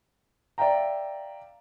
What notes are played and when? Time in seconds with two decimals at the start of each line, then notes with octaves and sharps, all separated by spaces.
0.58 D5 E5 F5 G5 A#5